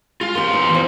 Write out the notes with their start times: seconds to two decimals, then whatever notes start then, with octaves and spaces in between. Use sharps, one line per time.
0.21 G#3 F4 F5
0.35 E2 A#3 C#4 G4 C6
0.51 B3 D#4
0.70 E2 F3 F#4